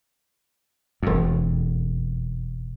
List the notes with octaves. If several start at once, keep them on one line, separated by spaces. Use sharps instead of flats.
E1 F2